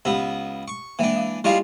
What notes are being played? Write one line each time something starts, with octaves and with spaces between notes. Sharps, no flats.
C#2 B3 G4
C#6
E3 G#3 A#3 D4
F5
G3 G#3 E4 F4